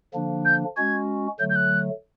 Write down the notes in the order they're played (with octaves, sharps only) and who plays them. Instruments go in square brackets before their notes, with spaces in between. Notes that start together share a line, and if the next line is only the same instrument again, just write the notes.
[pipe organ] D3 F3 A#3 D4
[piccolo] G6
[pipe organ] G#3 C#4 F#4 [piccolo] G#6
[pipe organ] D3 F#3 A3 [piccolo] G6
[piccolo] G6
F#6